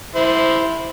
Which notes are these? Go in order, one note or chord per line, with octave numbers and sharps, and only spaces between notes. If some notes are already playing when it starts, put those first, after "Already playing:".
E4 C5